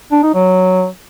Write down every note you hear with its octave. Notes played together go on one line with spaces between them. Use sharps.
D4
D#4
F#3